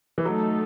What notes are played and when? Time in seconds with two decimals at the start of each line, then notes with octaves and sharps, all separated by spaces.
0.18 E3
0.25 F#3 A3 D#4 A4